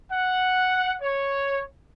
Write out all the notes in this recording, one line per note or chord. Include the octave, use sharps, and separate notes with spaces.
F#5
C#5